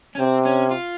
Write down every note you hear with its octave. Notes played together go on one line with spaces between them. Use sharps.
C#4
C3 C4
C#4
F4